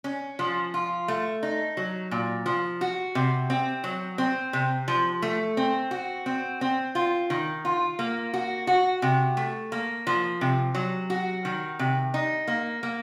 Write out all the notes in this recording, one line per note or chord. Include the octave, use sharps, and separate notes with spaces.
C#4
F3
F4
A3
D#4
F#3
A#2
F3
F#4
C3
C4
F#3
C4
C3
F3
A3
C4
F#4
C4
C4
F4
D#3
F4
A#3
F#4
F#4
C3
A3
A#3
F3
C3
F#3
F#4
D#3
C3
D#4
A#3
A#3